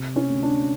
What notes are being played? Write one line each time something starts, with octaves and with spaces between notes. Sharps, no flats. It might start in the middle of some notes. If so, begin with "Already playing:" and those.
Already playing: C3
C#4
D2
D4